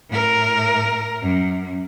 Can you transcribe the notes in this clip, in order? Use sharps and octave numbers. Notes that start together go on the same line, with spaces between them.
A2 A#4
F#2